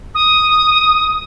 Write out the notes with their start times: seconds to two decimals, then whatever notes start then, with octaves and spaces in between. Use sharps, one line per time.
0.15 D#6